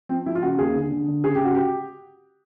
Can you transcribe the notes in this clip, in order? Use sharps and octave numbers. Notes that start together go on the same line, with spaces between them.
F3 C4
F3 E4
F4
C#3 F#4
D#2 G#4
D3
D3
D3
C#3 G#4
G4
C#3 F#4
G4